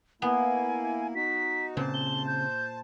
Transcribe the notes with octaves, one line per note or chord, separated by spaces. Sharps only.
A#3 B3 E4 G#5
D#4 F#4 B6
A#2 C#3 C4 C#4 C5 A5
G7
G6